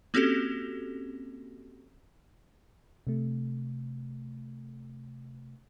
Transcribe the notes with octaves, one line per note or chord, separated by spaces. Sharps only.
A#3 C4 C#4 F#4 G4 A4
C3 A3